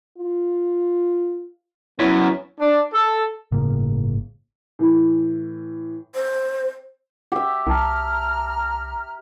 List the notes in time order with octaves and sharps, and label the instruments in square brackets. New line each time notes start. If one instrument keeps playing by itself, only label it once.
[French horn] F4
[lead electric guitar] F#2 [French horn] B3 [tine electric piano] E4 C#5 B6
[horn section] D4
A4
[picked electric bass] G1 A2 C#3 A#3
[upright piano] A2 E3
[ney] C5
[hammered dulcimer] G4 E5
[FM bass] C2 [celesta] G5 A5 [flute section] A#5 F6